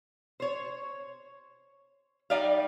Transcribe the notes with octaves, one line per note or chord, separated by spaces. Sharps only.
C5 C#5
G3 D#4 D5 E5 F5